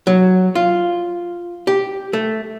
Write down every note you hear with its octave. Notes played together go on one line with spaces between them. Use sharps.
F#3
F4
G4
A3